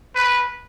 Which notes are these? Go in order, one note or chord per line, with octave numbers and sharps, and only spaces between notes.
B4